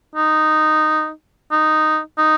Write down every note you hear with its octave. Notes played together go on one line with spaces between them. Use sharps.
D#4
D#4
D#4